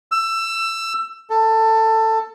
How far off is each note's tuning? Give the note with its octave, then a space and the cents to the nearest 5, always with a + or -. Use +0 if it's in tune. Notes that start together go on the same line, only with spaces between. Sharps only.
E6 +20
A4 +15